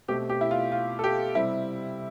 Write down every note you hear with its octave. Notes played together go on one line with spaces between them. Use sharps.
B2 A3 C4 G4
G4
E4
F4
F4
A4
G4
C3 G3 C4 E4